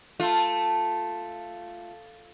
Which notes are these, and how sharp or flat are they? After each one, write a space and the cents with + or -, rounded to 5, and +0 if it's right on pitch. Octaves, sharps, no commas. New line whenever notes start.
A3 +0 F4 +0